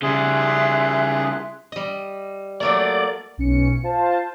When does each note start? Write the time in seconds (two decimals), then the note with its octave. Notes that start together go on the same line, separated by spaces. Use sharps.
0.02 C#3 G3 G#4 E5 C6 F#6
1.72 G3 D#5
2.60 F#3 A3 A#3 D5
3.38 B1 C#4 C#7
3.83 F4 C5 A5